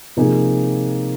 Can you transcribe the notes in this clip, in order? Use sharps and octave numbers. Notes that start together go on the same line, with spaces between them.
C3 F3 A#3 D#4 G#4